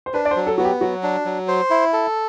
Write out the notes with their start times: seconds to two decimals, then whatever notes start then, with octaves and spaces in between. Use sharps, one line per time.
0.06 C5
0.14 D4 B4
0.25 D5
0.31 C5
0.36 F#3
0.47 A4
0.58 B3 F#4
0.65 G4
0.81 F#3 F#4
1.03 D4
1.25 F#3
1.48 C5
1.70 E4
1.93 A4